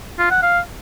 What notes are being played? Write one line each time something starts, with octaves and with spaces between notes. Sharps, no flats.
F4
F#5
F5